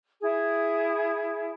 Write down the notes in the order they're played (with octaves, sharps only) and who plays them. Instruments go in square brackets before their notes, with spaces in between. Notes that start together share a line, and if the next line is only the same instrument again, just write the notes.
[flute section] E4 G#4